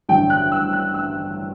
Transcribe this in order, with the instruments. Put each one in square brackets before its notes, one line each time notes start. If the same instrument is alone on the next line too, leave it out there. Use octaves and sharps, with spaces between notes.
[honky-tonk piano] A1 G2 D3 F#3 G5
F#6
E6
F#6
E6